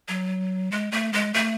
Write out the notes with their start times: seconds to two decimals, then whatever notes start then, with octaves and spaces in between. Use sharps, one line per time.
0.08 F#3
0.72 G#3
0.92 A3
1.13 G#3
1.34 A3